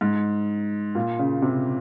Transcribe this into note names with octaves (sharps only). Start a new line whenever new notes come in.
G#2
A#2
C#3
C3